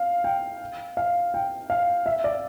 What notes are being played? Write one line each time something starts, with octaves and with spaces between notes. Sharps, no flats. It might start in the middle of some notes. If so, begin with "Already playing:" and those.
Already playing: F5
G5
F5
G5
F5
E5
D5